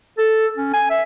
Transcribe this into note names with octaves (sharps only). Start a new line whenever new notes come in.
A4
C#4
G#5
E5